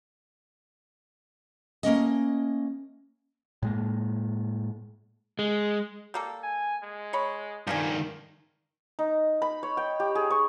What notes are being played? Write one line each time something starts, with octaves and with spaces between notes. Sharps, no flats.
A3 A#3 C#4 D#5
A2 G#3 A#3
G#3
G3 A#3 A4
G#5
G#3
C#5 B5
G2 D#3 F3 F4 G4 G#5
D#4
B5
C#5
G5
G4
G#4
C#6